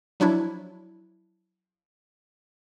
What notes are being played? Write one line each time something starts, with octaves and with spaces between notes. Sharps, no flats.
F3 F#3 D4 E4